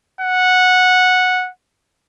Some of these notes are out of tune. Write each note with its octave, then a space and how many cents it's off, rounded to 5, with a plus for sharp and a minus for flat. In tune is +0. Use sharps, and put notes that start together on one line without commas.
F#5 -10